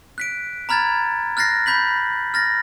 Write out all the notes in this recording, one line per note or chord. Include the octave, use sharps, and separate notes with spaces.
F#6 B6 D7
A#5 B5 F6 G#6 A6
F6 F#6 A6 A#6 C7
B5 G6 B6 F#7
F6 A6 A#6